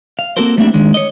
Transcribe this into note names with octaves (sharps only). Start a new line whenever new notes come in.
F5
A#3 C4 F#4 A4 A#4 C5
G3 A3 A#3 C4 D4 E4
D#3 G#3 D4
C#5 D#5